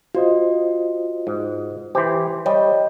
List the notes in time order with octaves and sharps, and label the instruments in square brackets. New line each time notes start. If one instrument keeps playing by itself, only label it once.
[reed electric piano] F4 C5 D#5 [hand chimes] F#4
[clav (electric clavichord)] G#2
[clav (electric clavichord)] E3 G4 [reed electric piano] C5 C6
[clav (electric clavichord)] G3 [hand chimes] C#5 D#5